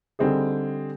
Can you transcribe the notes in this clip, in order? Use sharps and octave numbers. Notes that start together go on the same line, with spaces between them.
D3 G3 C4 D#4 G#4